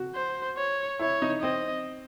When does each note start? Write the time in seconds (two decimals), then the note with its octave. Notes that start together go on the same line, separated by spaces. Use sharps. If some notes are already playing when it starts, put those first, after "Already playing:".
Already playing: F#4
0.15 C5
0.57 C#5
0.99 E4 C#5
1.22 D#4
1.42 C4 D#5